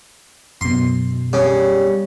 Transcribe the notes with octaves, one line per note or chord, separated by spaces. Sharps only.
F#2 B2 C6
C#3 G3